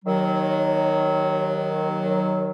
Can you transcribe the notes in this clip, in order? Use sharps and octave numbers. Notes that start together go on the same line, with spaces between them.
D#2 D#3 F#3